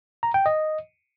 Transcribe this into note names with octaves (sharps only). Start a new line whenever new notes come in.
A#5
G5
D#5